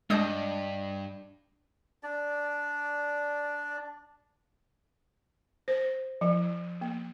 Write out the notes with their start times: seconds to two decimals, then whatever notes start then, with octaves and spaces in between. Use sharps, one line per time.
0.10 G2 G#3 D4 D#5 A5 D#6 G6
2.03 D4 D5
5.68 C5
6.21 F3
6.81 A#3